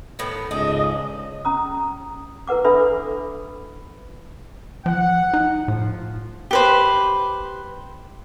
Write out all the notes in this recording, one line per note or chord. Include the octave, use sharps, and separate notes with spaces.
A2 D#3 B3
C#2 G#2 C#3 D4 D#5
C#4 A#5 D#6
E4 A#4 B4 F#5 D6
D4 A4 B4 E5 B5
F3 F#5
D#4
A2 F3
G4 B4 C5